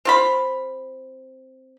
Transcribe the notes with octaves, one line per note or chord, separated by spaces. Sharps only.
C4 F4 B5